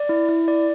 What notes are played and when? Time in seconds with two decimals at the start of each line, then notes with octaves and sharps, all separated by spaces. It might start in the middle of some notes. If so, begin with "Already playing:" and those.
Already playing: D5
0.09 E4
0.29 E4
0.48 D5